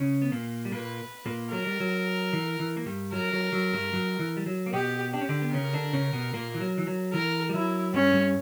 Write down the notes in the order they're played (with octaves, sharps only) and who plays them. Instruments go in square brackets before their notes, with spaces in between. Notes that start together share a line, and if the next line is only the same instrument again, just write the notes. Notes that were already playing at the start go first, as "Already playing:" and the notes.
Already playing: [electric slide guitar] C#3 C#4
B3
A#2 A#3
G3
[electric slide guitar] A#2 A#3 [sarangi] B4
[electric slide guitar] A#2 A#3
[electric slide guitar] F#3 [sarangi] A#4
[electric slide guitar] G3
F#3
E3
E3
A#3
G2 G3
[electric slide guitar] F#3 [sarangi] A#4
[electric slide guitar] F#3
F#3
G2 G3
F#3
E3
G3
F#3
A#3
[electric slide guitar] B2 B3 [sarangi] G4
[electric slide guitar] D4 [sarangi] G4
[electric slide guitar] C#4
D3 D4
B3
[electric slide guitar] C#3 C#4 [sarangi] A#4
[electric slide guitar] D3 D4
C#3 C#4
B2 B3
A#2 A#3
E3
F#3
E3
F#3
[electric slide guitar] E3 [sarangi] A#4
[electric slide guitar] G3
[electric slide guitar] F#3 [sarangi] E4
[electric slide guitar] G2 G3 [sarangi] C#4
[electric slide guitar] G2 G3